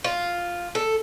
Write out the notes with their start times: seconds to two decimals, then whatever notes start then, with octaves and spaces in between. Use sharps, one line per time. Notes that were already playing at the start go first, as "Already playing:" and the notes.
0.04 F4
0.75 A4